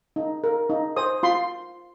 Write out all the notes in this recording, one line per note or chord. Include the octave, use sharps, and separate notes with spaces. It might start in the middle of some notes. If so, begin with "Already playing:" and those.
D#4
A#4
D#4
C5 D#6
F4 C6